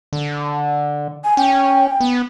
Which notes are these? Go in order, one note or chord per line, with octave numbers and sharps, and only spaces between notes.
D3
G#5
C#4 G5
B3